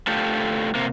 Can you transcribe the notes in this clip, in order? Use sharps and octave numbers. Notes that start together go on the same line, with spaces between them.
D3 A3 F4 G4
C3 A#3